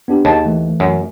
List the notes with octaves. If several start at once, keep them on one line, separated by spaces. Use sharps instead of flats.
B3 D4 G4
D#2 G#4 A5
E3 A3
F#2